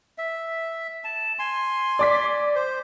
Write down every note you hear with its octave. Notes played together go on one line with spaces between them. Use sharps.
E5
A5
G#5 C6
D5 D6 B6
C5